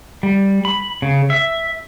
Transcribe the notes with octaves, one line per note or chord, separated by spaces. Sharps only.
G3
B5
C#3
E5